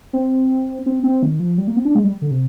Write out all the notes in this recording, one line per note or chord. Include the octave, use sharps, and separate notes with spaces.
C4
C4
C4
D#3
F3
G3
A#3
C4
D4
G#3
G3
D3
C3